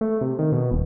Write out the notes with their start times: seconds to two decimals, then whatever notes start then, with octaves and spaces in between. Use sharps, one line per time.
0.01 A3
0.21 C3
0.39 D#3
0.52 B2
0.71 D#1